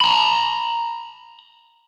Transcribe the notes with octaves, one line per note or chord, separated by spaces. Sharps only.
A#5 B5